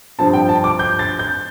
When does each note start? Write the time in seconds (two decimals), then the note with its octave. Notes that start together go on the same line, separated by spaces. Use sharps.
0.19 G2 F3 C4 A5
0.33 G5
0.49 A5
0.64 D6
0.79 G6
0.99 A6
1.19 G6